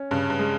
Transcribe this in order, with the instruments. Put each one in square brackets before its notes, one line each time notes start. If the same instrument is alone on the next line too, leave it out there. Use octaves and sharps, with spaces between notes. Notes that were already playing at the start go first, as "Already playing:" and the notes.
Already playing: [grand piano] C#4
[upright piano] G2 [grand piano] C#3
[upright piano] G2
[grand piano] G#3